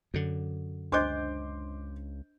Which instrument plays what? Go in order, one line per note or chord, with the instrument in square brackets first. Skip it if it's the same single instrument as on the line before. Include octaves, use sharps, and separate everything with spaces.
[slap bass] F#2 D3
[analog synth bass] C#2 [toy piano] D4 C5 D#5 [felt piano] C6 D6 G6